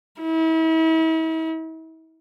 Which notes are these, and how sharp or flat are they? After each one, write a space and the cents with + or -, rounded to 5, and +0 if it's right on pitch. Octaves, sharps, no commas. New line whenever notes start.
E4 -40